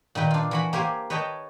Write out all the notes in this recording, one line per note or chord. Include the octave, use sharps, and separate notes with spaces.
A#2 D#3 B4 G5
D4 F4
E3 F#4 B5
A#3 G4 C5 G#5
B4 C#5 D#5 G5 A5